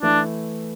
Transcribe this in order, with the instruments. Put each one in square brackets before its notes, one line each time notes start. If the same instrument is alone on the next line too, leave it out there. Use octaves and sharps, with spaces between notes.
[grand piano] E3 A3 E4 [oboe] D4